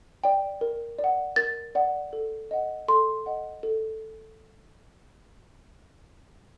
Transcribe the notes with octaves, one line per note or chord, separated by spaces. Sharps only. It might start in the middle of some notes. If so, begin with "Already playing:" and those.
D5 G5
A#4
D5
F#5
A#4 A6
D5 F#5
A4
D#5 F#5
A4 C6
D#5 F#5
A4